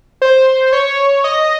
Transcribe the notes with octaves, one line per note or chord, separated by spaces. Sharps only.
C5
C#5
D#5